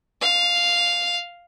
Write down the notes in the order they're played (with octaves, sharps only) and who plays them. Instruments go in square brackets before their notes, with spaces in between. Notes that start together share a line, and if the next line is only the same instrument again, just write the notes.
[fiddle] F5